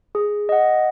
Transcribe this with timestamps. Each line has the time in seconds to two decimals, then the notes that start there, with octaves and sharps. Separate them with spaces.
0.15 G#4
0.49 D#5 F#5